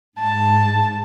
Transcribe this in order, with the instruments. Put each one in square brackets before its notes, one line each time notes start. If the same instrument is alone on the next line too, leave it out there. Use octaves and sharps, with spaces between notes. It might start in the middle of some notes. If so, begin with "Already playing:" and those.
[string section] G#2 [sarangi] A5